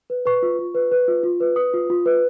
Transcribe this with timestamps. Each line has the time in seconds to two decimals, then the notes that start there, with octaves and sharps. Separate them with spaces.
0.10 B4
0.26 B4 C#6
0.43 F4
0.59 F4
0.75 B4
0.92 B4
1.08 F4
1.23 F4
1.40 B4
1.56 B4 D#6
1.74 F4
1.90 F4
2.06 B4